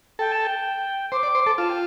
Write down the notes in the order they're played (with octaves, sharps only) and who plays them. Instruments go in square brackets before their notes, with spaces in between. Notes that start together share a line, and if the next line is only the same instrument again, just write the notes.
[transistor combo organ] A4 [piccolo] G5
[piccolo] A5
G5
[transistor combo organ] C5 [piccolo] D6
[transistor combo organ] D5
C5
A4
[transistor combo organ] F4 [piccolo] A5
[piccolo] G5